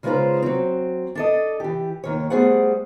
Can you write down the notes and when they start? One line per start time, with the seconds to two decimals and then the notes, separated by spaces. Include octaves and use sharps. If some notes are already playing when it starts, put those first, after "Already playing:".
0.03 C#3 G#3 D#4 F4 B4 C5
0.42 F#3 C4
1.15 D4 A4 D#5
1.60 E3 G4
2.04 D#2 D#3 C#5
2.30 G3 A3 B3 G#4 C5 F#5